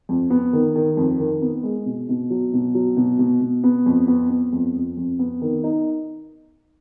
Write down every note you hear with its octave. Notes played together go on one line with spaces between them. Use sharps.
F2
B3
D#3
D#3
F2
D#3
B3
G#3
B2
B2
F#3
B2
F#3
B2
B2
B2
B3
F2
B3
B3
F2
F2
F2
B3
D#3
D#4